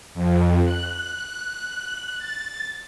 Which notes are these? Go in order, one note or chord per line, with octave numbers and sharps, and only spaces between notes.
F2
F#6
A6